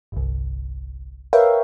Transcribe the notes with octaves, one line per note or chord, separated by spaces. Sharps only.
G1 C2
A#4 B4 C#5 E5 F5 G5